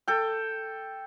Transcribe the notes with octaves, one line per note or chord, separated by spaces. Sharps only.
A4 G5